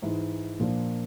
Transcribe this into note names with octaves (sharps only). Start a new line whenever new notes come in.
G#2 E3 G#3
A#2 F3 A#3 D4